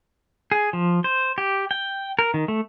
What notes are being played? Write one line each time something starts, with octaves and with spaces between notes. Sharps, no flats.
G#4
F3
C5
G4
G5
A#4
D#3
A3